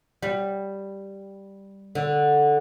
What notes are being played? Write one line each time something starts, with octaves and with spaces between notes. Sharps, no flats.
G3
D3